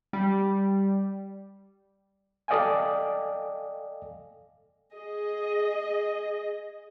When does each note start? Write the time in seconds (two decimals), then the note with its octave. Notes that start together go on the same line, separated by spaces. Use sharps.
0.13 G3
2.48 A4 D5 D#5 F5 G5 G#5
4.94 G#4 D#5